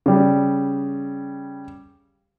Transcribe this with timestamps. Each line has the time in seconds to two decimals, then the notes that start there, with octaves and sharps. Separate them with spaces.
0.06 C#3 G3